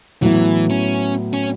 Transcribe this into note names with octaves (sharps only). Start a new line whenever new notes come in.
A2 E3 F#3 B3 E4
C#4
C#4